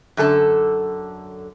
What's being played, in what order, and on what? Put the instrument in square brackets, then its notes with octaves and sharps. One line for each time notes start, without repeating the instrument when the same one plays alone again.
[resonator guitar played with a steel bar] F#2 D3 A4 A5